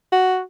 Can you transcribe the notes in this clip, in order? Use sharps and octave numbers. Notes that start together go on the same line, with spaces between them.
F#4